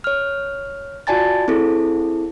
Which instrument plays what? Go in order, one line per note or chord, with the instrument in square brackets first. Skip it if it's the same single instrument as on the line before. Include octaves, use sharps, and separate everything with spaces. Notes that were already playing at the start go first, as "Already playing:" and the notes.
[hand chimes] C#5 F6
F4 F#4 D5 G#5 A5 A6
C4 E4 G#4 A4